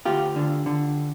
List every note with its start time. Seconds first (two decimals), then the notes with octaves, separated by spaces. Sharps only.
0.05 D2 F4 G4
0.36 D3
0.66 D3